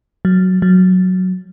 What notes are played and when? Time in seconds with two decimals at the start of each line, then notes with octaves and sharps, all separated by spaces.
0.25 F#3
0.62 F#3